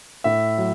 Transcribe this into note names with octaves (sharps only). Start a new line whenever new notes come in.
A2 E5
F#3